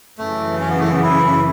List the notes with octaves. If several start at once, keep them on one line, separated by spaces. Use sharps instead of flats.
F#2 C#3 E3 A3
C#4
B3
A3
B3
E4